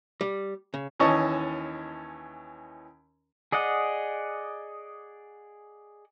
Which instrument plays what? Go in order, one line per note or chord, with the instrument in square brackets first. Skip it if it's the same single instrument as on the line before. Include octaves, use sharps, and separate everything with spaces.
[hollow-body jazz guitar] G3
C#3
[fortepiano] D#2 E3 C#4 D#5 A5 C#6
[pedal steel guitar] G#4 D5 D#5 F#5